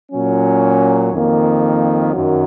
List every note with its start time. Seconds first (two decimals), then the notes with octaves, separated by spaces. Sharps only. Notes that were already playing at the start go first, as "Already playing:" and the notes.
0.12 A#2 F#3 C#4
1.12 F2 D#3 A#3
2.12 F#2 D#3 F#3